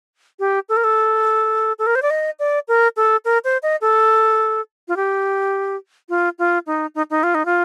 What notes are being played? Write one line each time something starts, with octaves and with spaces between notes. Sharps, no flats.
G4
A4
A#4
A4
A4
A#4
C5
D5
D#5
D5
A#4
A4
A#4
C5
D#5
A4
F4
G4
F4
F4
D#4
D#4
D#4
F4
D#4
F4